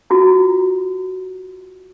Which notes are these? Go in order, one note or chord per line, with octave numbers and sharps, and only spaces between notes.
F4 F#4 A#5